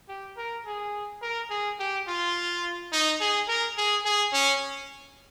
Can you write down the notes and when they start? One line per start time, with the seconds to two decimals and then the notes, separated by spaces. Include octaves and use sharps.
0.09 G4
0.37 A#4
0.66 G#4
1.22 A#4
1.50 G#4
1.79 G4
2.08 F4
2.93 D#4
3.21 G#4
3.48 A#4
3.77 G#4
4.05 G#4
4.33 C#4